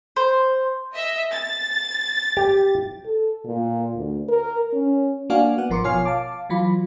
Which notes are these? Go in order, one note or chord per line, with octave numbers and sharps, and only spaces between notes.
C5
D#5 E5
A6
G4
A4
A#2
D2
A#4
C#4
A#3 D4 F#4 D5 F5 G#5
B3 F#5
G#1 F3 A#4 C6 D6 C#7
B2 F4 C#5 G#5 F6 C7
F5 A5 D6
E3 F#3 F4 B5